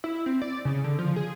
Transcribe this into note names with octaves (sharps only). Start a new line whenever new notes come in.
E4
C4
D5
C#3
D3
F3
G#4